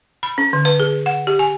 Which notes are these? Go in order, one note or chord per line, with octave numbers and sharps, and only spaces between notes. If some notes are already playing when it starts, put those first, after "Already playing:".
B5
C#4
D3
B4
G#4
F#5
G4
G#5